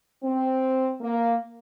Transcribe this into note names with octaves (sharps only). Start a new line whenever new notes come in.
C4
A#3